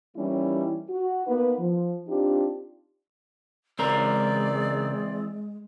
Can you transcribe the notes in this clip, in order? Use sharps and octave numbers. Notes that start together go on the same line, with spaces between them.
E3 G3 A#3 C#4 D#4 E4
F#4
A#3 B3 D#4 B4
F3
C4 D4 D#4 F4 G4
C#2 E3 G#3 C4 A#4 D5